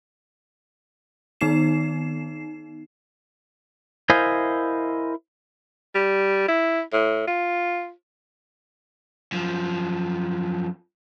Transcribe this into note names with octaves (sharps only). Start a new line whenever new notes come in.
D#3 B3 D#4 C7 E7
E4 A#4 C5 D#5 F5 G#5
G3
E4
A2
F4
F#2 F3